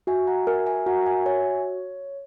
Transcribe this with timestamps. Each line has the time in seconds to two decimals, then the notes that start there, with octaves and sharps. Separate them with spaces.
0.07 F#4 E5 G#5
0.27 F#5 A#5
0.47 A#4 E5 G#5
0.66 E5 G#5
0.86 F#4 F#5 A#5
1.06 E5 G#5
1.26 C#5 E5 G#5